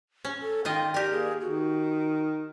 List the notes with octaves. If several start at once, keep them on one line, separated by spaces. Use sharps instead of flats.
C#4
A4
D#3 F4 D#5 G5
G4 A#4 D5
A#3 G#4
D#3 F#4